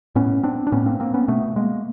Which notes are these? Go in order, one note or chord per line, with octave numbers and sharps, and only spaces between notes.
A2 B3 C#4
C4 D4
D4
A2 B3 C#4
A#3 C4
A#3 C4
B3 C#4
B2 A3 B3
G#3 A#3